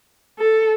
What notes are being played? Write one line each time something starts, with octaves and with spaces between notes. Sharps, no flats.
A4